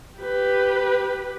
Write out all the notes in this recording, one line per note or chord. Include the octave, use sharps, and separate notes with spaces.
G4 B4